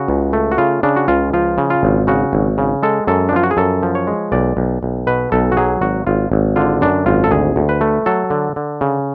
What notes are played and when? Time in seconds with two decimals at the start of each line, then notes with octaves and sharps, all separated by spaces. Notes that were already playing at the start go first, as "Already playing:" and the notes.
Already playing: C#3 F#4
0.08 C#2
0.33 A3
0.52 F#4
0.58 C#3 F4
0.83 C#3 D4
0.96 F#4
1.08 C#2 F4
1.33 F3 F4
1.58 C#3
1.70 F4
1.83 G#1
2.07 C#3 F#4
2.33 G#1
2.58 C#3
2.83 G#3 A4
3.07 F#2 A4
3.29 D4
3.33 F3 F4
3.43 F#4
3.51 G#4
3.57 F#2 A4
3.83 F3
3.95 C#5
4.07 G#3
4.32 B1 D5
4.57 B1
4.83 B1
5.07 B2 B4
5.32 B1 A4
5.52 F#4
5.57 F#3 G#4
5.81 G#1 F#4
6.07 G#1 F4
6.32 G#1
6.56 D3 F4
6.81 F#2 D4
7.06 G#1 F4
7.24 A4
7.31 D2 G#4
7.56 D2
7.69 B4
7.81 A3
8.06 F#3 A4
8.30 D3
8.56 D3
8.81 C#3